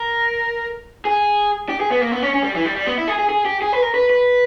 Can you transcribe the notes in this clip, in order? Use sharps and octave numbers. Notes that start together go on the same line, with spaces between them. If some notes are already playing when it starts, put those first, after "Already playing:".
Already playing: A#4
G#4
G4
G#4
B3
A#3
B3
C#4
C#4
G3
E3
G3
G3
B3
E4
G#4
G#4
G#4
G4
G#4
B4
A#4
B4
B4